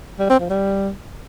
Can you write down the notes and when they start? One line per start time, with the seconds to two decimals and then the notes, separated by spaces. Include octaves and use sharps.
0.19 G3
0.30 C4
0.40 F3
0.50 G3